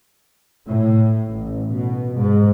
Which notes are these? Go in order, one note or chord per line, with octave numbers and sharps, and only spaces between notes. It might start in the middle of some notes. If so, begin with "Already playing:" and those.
A2
A1
B2
G#2